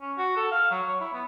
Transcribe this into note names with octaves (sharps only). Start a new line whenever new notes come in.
C#4
F#4
A4
F5
F#3
C#5
E4
B3